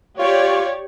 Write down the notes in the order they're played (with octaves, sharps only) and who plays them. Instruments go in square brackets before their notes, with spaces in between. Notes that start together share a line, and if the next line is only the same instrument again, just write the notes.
[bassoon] F4 [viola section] G4 C#5 D5